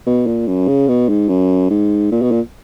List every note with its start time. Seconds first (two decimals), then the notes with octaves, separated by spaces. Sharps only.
0.06 B2
0.27 A#2
0.47 F#2
0.68 C#3
0.88 B2
1.09 G#2
1.29 F#2
1.70 G#2
2.12 A#2
2.22 B2
2.31 A#2